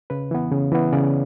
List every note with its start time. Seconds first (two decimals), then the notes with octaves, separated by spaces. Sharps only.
0.10 C#3 B4
0.31 E3 B3
0.51 C#3
0.72 E3 B3
0.93 C#3 D5